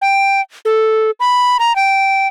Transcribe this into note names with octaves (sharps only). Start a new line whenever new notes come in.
G5
A4
B5
A#5
G5